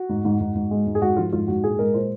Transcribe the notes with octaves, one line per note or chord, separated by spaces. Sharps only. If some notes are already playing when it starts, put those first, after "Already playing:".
Already playing: F#4
G#2
G#2
G#2
G#2
G#3
G#2
G#4
G#2 F#4
F3 F4
G#2 F4
G#2 F#4
A#2 G#4
G#3 A#4
A#2 C5